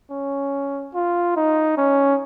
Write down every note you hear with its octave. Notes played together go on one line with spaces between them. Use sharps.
C#4
F4
D#4
C#4